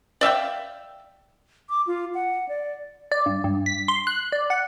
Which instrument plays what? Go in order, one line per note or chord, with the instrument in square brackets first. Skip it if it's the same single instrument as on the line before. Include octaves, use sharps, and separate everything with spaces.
[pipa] D5 E5 F5 G5
[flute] D6
F4
F#5
D5
[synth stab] D5
G2
G2
B6
C6
F#6
D5
F#5